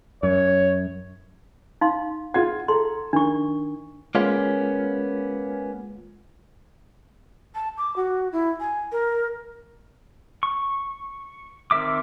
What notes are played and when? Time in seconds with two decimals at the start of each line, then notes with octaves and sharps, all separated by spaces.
0.23 F#2 C#5
1.81 D#4 F5 C6
2.34 F4 F#5 G#6
2.68 A4 A#5 C6
3.13 D#3 D4 C#6
4.15 G#3 A#3 B3 C#4 F4
7.55 A5
7.78 D6
7.96 F#4
8.32 E4
8.60 G#5
8.92 A#4
10.43 C#6
11.71 D#3 C4 A#4 E5 D6